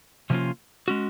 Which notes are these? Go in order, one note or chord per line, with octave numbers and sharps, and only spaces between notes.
C3 F3 A#3 C#4 F4
G#3 C#4 F#4